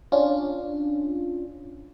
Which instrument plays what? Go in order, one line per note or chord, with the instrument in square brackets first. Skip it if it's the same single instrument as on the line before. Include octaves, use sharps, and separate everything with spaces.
[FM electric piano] C#4 D4 F4